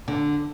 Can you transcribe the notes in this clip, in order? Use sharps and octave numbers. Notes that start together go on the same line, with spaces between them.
D3